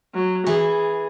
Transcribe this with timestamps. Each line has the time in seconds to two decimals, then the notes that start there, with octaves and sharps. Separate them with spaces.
0.14 F#3
0.47 E3 G#4